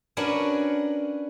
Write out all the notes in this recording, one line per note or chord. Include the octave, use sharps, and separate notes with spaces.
C#4 D4 F#4 A#4 B4 C#5